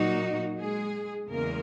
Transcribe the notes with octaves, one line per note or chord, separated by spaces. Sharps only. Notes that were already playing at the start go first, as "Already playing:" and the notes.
Already playing: A#2 F#3 A#3 D#4 F#4
G#3 G#4
E2 C#3 G#3 A#3 A#4